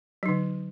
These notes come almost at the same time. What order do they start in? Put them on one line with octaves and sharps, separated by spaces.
F#3 D#4 D3